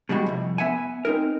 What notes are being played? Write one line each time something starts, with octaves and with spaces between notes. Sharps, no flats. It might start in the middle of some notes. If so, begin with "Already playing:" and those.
B2 G3 G#3 F#4 G4
C2 F2
B3 E5 F#5 G#5
C4 D#4 A#4